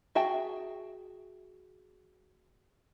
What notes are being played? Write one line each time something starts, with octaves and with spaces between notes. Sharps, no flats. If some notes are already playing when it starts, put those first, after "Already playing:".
F#4 G#4 E5 G5 A5